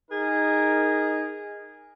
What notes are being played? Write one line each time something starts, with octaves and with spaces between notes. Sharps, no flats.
D#4 G#4 A#4